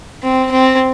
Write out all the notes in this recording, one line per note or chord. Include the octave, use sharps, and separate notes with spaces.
C4
C4